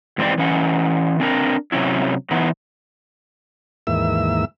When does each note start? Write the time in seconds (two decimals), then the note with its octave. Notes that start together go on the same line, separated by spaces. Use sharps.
0.18 G#2 E3 C4 G4 D5
0.38 E3 C#4 F#5
1.20 C4 D4 A#4
1.72 C3 F#3 C#4 E4
2.31 E3 F#3 B3 D#4
3.87 D#2 G#2 E3 A#3 E5 E6